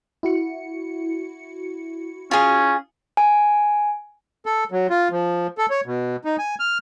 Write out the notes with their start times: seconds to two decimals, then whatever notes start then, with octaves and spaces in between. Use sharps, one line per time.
0.23 E4 F#4 C#7
2.31 C#4 F4 G#4
3.17 G#5
4.46 A4
4.71 F#3
4.90 F4
5.11 F3
5.58 A4
5.70 C#5
5.86 B2
6.25 D#4
6.39 G#5
6.60 F6